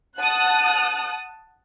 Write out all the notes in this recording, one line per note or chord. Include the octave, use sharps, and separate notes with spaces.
F#5 A5 D#6 F#6